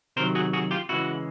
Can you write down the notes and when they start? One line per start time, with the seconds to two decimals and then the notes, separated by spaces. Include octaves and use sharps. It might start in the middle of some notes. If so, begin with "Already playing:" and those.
0.17 C3 D#3 F#3 A#4 C5
0.35 F#4 G#4
0.53 F#4 G#4
0.71 F4 G4
0.89 C#3 E3 G#3 E4 F#4